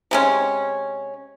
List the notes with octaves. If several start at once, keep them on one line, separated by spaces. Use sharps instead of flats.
C3 G#3 C#4